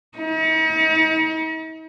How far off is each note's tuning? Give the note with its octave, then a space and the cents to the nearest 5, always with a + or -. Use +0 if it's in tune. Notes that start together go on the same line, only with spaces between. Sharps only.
D#4 +45